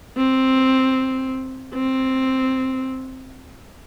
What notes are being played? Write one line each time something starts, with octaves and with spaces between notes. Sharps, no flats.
C4
C4